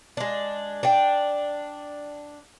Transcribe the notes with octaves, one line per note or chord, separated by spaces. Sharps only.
G#3 D4
D4 G5